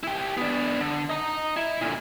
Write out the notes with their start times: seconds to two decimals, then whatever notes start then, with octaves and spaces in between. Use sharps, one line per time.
0.03 E4 G4
0.37 B3 D4
0.80 D3
1.10 D#5 A#5
1.57 E4
1.81 A#2 D3